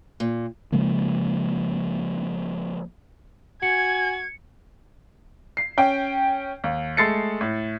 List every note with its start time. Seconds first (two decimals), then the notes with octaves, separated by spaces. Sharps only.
0.20 A#2
0.72 C#3 F3 G#3 A#3
3.63 F#4 G#5 G#6 C#7
5.57 C7
5.77 C#4 G5
6.64 D#2
6.97 G#3 A3 A4 A6 C7 C#7
7.41 A2